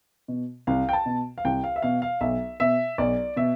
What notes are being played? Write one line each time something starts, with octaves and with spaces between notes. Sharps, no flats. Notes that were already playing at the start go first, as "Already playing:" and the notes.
B2
C2 F5
G5
A5
B2
F5
C2 G5
F5
E5
B2 F5
F5
B1 E5
B2 E5
B1 D5
B2 E5